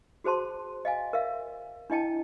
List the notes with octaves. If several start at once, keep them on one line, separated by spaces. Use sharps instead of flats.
F#4 G#4 C5 A5 C6
D#5 F5 G#5
A#4 E5 F5
D4 E4 D#5 G5 A5